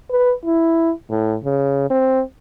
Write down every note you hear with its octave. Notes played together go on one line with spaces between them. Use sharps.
B4
E4
A2
C#3
C4